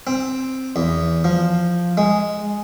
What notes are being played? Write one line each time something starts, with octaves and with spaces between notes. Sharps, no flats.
C4
E2
F3
G#3